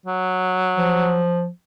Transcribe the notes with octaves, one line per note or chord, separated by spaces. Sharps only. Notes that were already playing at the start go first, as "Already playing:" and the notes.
F#3
F3